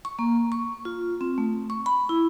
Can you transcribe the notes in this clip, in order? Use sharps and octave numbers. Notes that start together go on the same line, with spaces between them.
C#6
A#3
C#6
F4
C4
A3
C#6
B5
E4